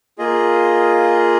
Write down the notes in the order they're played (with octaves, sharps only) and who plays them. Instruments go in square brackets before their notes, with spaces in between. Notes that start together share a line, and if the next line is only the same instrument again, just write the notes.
[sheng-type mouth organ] A#3 F4 G#4 D#5